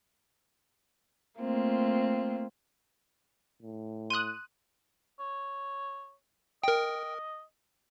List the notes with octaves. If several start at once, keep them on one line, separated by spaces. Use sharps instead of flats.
A3 A#3 C4 F4
A2
C6 D#6 F#6 D#7
C#5
A#4 D#5 G5